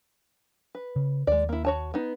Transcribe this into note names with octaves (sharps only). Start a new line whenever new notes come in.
B4
C#3
D#2 G#3 D5
A#3 E4
F#4 C#5 A5
B3 D#4